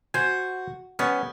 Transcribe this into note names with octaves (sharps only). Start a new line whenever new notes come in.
F#4 C5 G#5
G3 B3 C#4